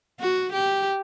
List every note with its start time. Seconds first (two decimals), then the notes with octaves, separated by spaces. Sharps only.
0.20 F#4
0.53 G4